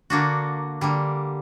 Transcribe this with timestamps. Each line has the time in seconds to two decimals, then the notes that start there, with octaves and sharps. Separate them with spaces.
0.10 D3 A#3 D4 F#4
0.81 D3 G3 A#3